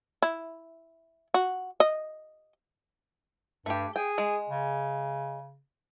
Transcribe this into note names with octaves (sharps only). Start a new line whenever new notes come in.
E4
F#4
D#5
G2 A3 G4
G#4 G5
G#3
C#3